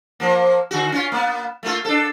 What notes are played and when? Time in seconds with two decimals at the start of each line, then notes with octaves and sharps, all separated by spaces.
0.20 F3 A#3
0.71 D3 F#4
0.92 C#4 F4
1.12 A#3 B3
1.63 A3 A#3 F4
1.85 D4 A4